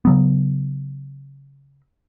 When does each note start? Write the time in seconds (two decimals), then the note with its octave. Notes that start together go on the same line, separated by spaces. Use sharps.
0.05 C#3 F#3 B3